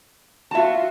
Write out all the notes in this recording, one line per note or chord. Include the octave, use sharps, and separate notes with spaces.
F4 F#4 E5 A5